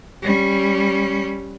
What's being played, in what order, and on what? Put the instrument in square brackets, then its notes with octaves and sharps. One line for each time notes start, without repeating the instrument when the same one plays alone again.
[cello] G3 C#4